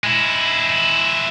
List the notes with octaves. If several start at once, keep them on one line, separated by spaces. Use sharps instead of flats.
G#3 E4